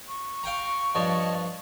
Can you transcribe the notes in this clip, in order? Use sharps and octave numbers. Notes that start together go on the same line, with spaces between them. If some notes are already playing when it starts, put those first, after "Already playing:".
C#6
F5 G5 A#5
G2 F3 C#5 D#5 A5